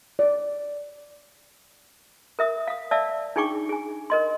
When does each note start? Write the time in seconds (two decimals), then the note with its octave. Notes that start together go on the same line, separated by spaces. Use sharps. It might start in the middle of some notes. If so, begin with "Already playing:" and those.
0.19 D5
2.39 A#4 E5 D#6
2.67 F5 D#6
2.91 D5 E5 F5 A5 E6
3.36 D4 D#4 G#4 G5 C#6 D6
3.69 G#4 G#5
4.10 A#4 D#5 C6